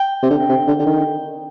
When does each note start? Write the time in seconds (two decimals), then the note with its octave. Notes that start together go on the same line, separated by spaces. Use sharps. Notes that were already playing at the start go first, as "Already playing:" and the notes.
Already playing: G5
0.22 C3
0.30 D3
0.49 C3
0.67 D3
0.79 D3
0.86 D#3